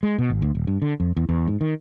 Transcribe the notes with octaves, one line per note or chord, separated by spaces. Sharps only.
G#3
B2
G#1
D2
D#1
G2
D3
F2
E2
E2
G#2
D#3